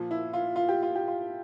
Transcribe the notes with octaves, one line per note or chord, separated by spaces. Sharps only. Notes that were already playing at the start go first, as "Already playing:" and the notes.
Already playing: A#2 F3
E4
F4
F4
G4
F4
G4
F4